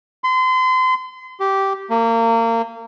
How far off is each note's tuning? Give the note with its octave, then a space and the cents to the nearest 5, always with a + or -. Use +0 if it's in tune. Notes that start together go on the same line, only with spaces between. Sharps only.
C6 -35
G4 -10
A#3 -30